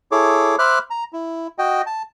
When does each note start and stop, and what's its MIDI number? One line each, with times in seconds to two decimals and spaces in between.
0.12 0.56 64
0.12 0.56 68
0.12 0.56 69
0.12 0.56 73
0.12 0.56 86
0.59 0.79 72
0.59 0.79 76
0.59 0.79 83
0.59 0.79 86
0.59 0.79 89
0.59 0.79 90
0.90 1.04 82
1.13 1.47 64
1.59 1.82 66
1.59 1.82 75
1.59 1.82 79
1.87 2.03 81